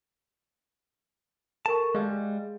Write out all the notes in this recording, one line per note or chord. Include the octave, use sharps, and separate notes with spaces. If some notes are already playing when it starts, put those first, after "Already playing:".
A4 A#4 A5 C#6
G3 G#3 G#4 F5